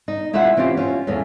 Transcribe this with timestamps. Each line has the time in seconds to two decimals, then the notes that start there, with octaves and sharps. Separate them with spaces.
0.08 D#4
0.33 C#4 E4 F4 B4 E5 F#5
0.57 E3 C4 C#4 F4 G4
0.77 C#4 F4
1.07 E2 A2 C#4